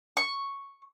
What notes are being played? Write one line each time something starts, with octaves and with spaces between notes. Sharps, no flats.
C#6